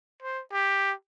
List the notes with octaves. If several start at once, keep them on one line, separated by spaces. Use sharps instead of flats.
C5
G4